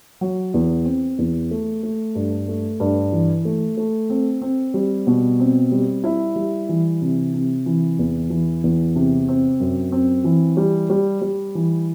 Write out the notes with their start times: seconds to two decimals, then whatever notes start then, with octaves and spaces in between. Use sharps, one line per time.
0.21 F#3
0.54 E2
0.85 C4
1.18 E2
1.51 A3
1.83 A3
2.15 G2
2.48 A3
2.80 G2
3.12 E3
3.45 A3
3.77 A3
4.10 C4
4.42 C4
4.74 G3
5.07 B2
5.40 C4
5.72 G3
6.04 E4
6.36 G3
6.69 E3
7.02 C3
7.34 C3
7.66 E3
7.99 E2
8.30 E3
8.64 E2
8.95 C3
9.28 C4
9.60 F#2
9.92 C4
10.24 E3
10.57 G3
10.90 G3
11.21 G3
11.55 E3